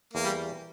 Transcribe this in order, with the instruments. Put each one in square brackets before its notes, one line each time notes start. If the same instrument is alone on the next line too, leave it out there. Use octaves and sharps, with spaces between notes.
[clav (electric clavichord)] E2 [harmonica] A#3
[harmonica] G3